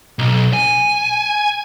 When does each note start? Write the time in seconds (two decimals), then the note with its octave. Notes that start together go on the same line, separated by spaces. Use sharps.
0.19 B1
0.53 G#5